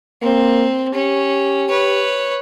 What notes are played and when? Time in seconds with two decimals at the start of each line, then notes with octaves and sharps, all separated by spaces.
0.22 A#3 C4
0.94 C#4 G4
1.69 B4 C#5